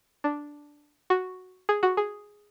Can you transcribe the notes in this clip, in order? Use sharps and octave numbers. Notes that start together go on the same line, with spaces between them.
D4
F#4
G#4
F#4
G#4